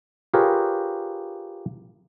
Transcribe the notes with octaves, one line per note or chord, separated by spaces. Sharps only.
F4 G4 G#4 A#4 B4 C#5